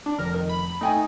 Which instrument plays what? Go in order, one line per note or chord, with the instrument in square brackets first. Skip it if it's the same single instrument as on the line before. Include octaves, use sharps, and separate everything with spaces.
[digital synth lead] D4
[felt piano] F1 [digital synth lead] A#4
[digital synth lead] D#3
B5
[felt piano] A3 G5 G#5 [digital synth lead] D#4